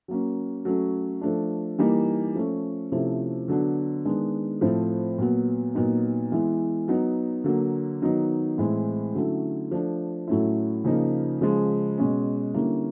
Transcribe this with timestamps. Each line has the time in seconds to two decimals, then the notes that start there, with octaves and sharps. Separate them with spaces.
0.08 F#3 A#3 C#4
0.65 F#3 A3 C#4
1.21 F3 A3 D4
1.79 E3 G3 A#3 D#4
2.35 F3 A3 C#4
2.92 C3 F3 A3 C#4 E4
3.48 D3 F#3 B3 D4
4.05 D#3 G#3 B3 D4
4.61 A2 F3 A3 C4
5.18 A#2 F#3 B3
5.75 A#2 F#3 B3 D#4
6.32 E3 G#3 B3 E4
6.88 F#3 B3 D#4
7.44 D3 F#3 A#3
8.02 D#3 F#3 B3 D#4
8.58 A2 E3 G#3 C4 E4
9.14 D3 F#3 A3 C#4 E4
9.71 F3 A3 D4
10.28 A2 F#3 A3 C#4 E4
10.84 C#3 F3 A#3 D#4
11.41 C#3 F3 G#3
11.98 B2 G#3 C#4
12.54 D3 G3 A#3 C#4 E4